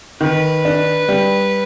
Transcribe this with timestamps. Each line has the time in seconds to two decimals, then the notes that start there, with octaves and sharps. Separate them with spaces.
0.21 D#3 B4
0.65 D4
1.09 G3